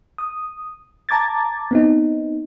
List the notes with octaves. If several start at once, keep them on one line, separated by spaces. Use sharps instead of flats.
D#6
A5 A#5 D6 G#6 A6
B3 C4 D#4